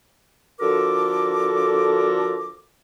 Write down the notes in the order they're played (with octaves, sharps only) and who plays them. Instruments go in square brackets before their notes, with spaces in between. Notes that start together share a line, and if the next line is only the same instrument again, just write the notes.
[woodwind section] D3 F3 F#4 A4 A#4 D6